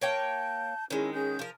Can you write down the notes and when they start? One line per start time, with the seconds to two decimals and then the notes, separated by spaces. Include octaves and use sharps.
0.01 A#3 C#5 G5 A5 G6
0.90 D#3 G#3 C#4 E4
1.13 C#4 G#4 G6
1.39 F3 A#4